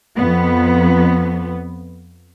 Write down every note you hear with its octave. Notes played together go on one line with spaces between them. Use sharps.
F2 F3 B3